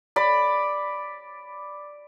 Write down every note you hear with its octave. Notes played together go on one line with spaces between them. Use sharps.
D5 B5